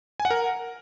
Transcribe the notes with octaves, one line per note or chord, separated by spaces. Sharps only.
G#5
F#5
A#4